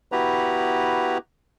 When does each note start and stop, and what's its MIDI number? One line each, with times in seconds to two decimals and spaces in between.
0.12 1.18 59
0.12 1.18 64
0.12 1.18 66
0.12 1.18 67
0.12 1.18 71
0.12 1.18 82